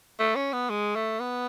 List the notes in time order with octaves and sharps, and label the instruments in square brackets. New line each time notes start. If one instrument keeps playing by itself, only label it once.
[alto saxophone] A3
C#4
B3
G#3
A3
B3